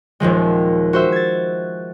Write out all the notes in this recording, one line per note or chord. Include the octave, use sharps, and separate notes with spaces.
D#1 D#2 F3 G#3
F#4 C5 E5
G#6 A6